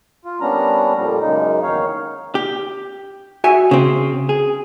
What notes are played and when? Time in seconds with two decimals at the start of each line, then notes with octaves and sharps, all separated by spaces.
0.25 F4
0.41 G3 A#3 B3 C#4 D4 A#5
0.96 F2 A#2 F3 G3
1.21 F#2 C#3 G#3 A#3 D#4
1.63 E2 D#3 D#4 C#5 F5
2.35 G4
3.44 F#4 E5 G#5
3.71 C#3 C4
4.29 G#4